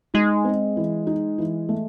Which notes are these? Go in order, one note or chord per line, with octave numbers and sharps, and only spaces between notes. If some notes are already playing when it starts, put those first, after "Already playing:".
G#3 D#4
C4
E3
D#4
E3
A3